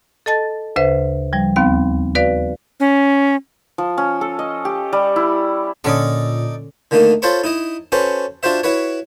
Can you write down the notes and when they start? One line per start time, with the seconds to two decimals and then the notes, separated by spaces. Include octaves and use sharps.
0.26 A4 D#5 A5 A6
0.76 D2 C#3 B4 C5 E5
1.33 F3 G3
1.56 D#2 B3 C4 F5
2.15 F#4 B4 D5 F5
2.80 C#4
3.78 F3
3.98 C#4
4.21 A4
4.39 D#5
4.65 G4
4.93 G3
5.16 E4
5.84 A#2 D3 C#4 D#4 A4 D5
6.91 D3 D#3 A3 A#3 D#4
7.22 F4 A4 C5 C#5 B5 C#6
7.44 D#4 E4 D#5
7.92 C#4 F#4 A4 B4 C5
8.43 D4 F4 F#4 C5 E5
8.63 E4 F#4 B4 C#5